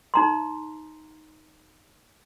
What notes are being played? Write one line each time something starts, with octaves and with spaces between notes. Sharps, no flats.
D#4 A#5 C6